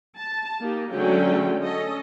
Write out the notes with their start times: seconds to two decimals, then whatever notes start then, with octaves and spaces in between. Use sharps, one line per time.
0.18 A5
0.60 A#3 D#4 G4
0.91 D3 F#3 G#3 A3 C#4 G5
1.63 C#4 A4 D#5